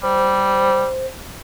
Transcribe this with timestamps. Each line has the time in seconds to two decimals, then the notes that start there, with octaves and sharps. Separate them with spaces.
0.03 G3 C5